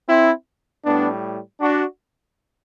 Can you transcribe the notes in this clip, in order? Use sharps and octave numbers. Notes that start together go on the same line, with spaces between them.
C4 E4
A2 G3 B3 D4
D4 F#4